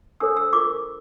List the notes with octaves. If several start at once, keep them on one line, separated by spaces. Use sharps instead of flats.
D4 A4 C5 E6
E6
F4 A#4 D6